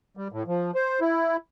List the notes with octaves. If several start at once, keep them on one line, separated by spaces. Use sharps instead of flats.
G3
A2
F3
C5
E4